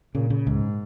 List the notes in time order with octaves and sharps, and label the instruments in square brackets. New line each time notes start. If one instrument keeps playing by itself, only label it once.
[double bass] A#2 [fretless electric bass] C#3
[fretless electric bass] C#3
[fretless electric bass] C#2 [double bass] G#2